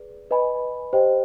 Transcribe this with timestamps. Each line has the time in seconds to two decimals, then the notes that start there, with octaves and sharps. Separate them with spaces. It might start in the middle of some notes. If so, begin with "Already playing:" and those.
Already playing: G#4 B4 D5
0.31 B4 D#5 G#5 B5
0.93 G4 C5 D#5 G5